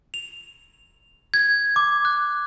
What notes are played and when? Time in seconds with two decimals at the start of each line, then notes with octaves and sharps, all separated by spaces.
0.14 F7
1.34 G#6
1.76 D6
2.05 F#6